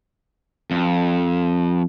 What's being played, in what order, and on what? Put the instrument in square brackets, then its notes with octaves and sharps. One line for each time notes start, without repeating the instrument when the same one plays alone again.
[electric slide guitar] F2